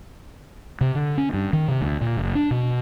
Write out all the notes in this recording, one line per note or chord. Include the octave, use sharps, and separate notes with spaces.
C3
D3
C#4
G2
D#3
C3
D2
A#2
F#1
D4
B2